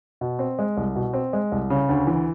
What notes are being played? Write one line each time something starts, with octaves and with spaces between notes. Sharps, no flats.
B2
C4
G#3
C2
B2
C4
G#3
C2
C#3
D2
E3